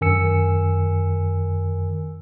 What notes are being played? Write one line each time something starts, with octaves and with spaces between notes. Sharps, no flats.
F#2 D#3 A#4 G#5 E6 C#7